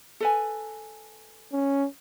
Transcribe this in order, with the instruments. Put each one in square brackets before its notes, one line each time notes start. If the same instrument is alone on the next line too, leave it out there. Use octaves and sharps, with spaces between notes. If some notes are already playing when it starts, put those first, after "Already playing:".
[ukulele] A4 B4 G#5
[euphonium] C#4